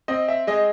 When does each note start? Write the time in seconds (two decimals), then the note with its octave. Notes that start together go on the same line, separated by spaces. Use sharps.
0.08 C4 D#5
0.28 E5
0.47 G#3 D#5